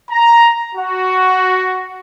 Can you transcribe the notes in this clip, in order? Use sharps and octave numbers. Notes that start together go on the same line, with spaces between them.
A#5
F#4